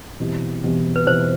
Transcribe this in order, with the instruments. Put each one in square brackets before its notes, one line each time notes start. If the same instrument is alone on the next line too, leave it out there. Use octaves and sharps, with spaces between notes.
[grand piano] E2 B2 G3 C4 E4
E2 B2 G3 C4 E4
[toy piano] B4
[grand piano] E2 B2 G3 C4 E4 [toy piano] C5